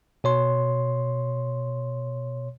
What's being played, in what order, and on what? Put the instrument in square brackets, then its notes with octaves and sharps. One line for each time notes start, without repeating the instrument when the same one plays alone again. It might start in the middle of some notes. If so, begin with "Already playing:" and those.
[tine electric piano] B2 C#5 C6